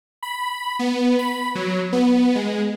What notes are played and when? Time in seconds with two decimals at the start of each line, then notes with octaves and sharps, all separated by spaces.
0.23 B5
0.79 B3
1.19 B5
1.55 F#3
1.93 B3
2.35 G#3